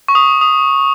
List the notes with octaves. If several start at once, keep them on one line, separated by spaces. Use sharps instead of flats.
C#6
D#6
D#6